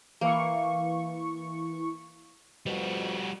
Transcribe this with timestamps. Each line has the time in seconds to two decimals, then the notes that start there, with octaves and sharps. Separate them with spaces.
0.21 E3 A#3 C#6
2.66 F2 B2 G3 F#4